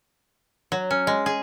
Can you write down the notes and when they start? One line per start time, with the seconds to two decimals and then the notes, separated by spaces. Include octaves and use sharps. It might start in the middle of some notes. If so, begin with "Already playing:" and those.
0.72 F#3
0.91 C#4
1.07 G#3
1.26 G#4